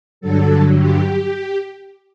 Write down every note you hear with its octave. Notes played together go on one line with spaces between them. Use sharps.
G2 D3 F#3 A4
G4